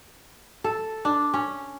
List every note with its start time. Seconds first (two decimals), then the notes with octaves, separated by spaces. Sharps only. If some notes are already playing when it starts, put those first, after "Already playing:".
0.64 A4
1.05 D4
1.34 C#4